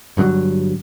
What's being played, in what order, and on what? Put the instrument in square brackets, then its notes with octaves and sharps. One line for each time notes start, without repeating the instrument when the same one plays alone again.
[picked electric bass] G1 G2 D3 F#3